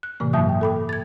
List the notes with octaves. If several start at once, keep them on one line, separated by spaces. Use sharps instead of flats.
F#6
A2 C3 E3 A#3
G2 F#3 A#3 E5 A5 D#6
G5
A4 B5 D6
G#6 A6